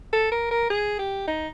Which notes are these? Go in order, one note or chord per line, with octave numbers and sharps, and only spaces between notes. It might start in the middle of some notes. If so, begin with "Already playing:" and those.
A4
A#4
A#4
G#4
G4
D#4